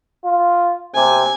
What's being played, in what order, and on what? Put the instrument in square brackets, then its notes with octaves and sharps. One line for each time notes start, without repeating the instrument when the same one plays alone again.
[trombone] F4
[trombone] C3 [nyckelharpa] G#5